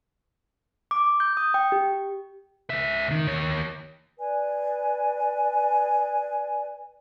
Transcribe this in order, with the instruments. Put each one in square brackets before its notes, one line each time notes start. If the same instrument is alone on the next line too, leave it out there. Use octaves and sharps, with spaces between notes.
[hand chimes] D6
G6
D#6
G5
G4
[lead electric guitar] C#2 E5
D#3
D#2 C#5
[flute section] B4 D5 G#5